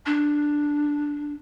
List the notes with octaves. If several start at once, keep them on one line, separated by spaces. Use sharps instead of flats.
D4